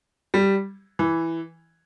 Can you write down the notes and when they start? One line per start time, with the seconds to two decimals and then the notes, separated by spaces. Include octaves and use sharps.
0.34 G3
0.99 E3